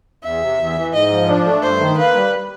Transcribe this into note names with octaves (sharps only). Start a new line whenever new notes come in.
E2 E5
C3
E2
E3
G#2 D#5
F3
D4
A3
G2 C5
D#3
A#3 B4
G3